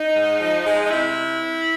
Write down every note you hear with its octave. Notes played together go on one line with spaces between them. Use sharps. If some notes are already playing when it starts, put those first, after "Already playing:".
Already playing: D#4
G#2
F3
G#3
D#4
C3 E4